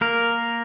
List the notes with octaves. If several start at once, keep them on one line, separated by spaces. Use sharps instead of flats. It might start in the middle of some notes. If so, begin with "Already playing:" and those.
A#3 A#4